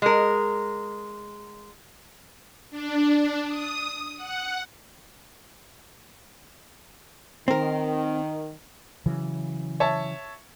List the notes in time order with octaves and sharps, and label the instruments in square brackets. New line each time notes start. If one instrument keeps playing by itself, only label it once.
[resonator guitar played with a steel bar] G#3 A#4
[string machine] D4
D#6
F#5
[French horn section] D#3 [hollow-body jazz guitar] C4 A#4
[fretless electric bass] C#3 E3 F#3
[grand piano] C#5 E5 A5